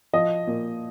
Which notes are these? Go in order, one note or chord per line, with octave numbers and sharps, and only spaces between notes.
F3 D#5
A#2